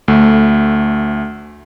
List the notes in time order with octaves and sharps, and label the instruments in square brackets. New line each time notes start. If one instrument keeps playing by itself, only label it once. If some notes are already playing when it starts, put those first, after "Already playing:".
[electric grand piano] D2 A3